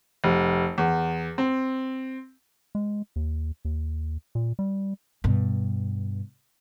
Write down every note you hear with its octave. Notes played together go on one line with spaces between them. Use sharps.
F1
E2
C4
G#3
D#2
D#2
A#2
G3
G2 B2